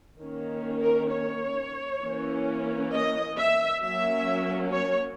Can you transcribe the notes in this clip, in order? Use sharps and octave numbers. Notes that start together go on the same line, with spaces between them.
D#3 A#3 C#4
A#4
C#5
E3 A#3 C#4
D#5
E5
F#3 A#3 C#4 E5
C#5